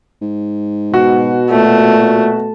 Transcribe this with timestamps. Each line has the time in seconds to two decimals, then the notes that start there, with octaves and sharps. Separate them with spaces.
0.21 G#2
0.94 B2 F#4
1.50 A#2 A3